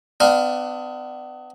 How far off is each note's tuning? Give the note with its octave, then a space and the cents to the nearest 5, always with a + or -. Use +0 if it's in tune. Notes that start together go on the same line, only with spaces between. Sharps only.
B3 +35 D4 +25 F5 +0